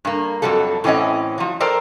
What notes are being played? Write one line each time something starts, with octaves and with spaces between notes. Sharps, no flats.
G2 A#3
F2 C3 F#3 G3 A4
A2 E3 C4 C#4 D#5 F#5
F3 F#3
A4 A#4 C5 D5 G5